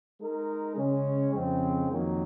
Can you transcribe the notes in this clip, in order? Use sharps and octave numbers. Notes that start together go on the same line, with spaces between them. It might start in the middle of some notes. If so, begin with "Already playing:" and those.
G#3 D#4 A#4
C#3 G#3 C#4
F2 C#3 G#3 C4
F2 D#3 F#3 A#3